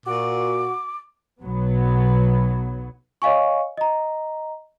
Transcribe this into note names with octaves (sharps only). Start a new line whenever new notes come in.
A#2 F#4 D6
B1 F#3 B3
C#5 D#5 F5 G#5 C#6
D#5 A#5